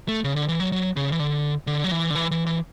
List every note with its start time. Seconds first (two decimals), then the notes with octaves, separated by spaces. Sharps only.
0.08 A3
0.24 C#3
0.36 D3
0.48 E3
0.60 F#3
0.72 F#3
0.96 C#3
1.12 E3
1.20 D3
1.67 D3
1.84 F#3
1.91 E3
2.10 D3
2.15 E3
2.31 E3
2.46 E3